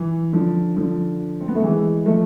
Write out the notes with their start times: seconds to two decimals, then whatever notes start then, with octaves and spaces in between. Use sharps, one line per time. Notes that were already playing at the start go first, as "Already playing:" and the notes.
Already playing: E3
0.33 D3 F3
0.77 D3 F3
1.40 C4
1.48 B3
1.55 A3
1.63 E3 G#3
2.06 F3 A3